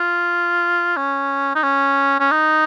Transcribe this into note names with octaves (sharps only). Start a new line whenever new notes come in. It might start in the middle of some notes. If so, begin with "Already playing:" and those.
Already playing: F4
C#4
D#4
C#4
C#4
D#4